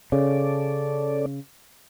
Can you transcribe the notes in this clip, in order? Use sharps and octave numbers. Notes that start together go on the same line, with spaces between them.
C#3 C#4 A4 D5